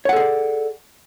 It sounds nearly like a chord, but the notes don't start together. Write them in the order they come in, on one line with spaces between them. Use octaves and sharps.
C#5 F#5 A4 G#4 D5